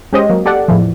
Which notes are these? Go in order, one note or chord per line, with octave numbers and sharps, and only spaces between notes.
G#3 C#4 G4 C5 D#5
F#3 A#3
G4 A4 D5 F#5
E2 A2 E3 F3